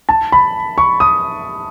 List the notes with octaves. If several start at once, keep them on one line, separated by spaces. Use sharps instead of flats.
A5
B5
C#6
D#6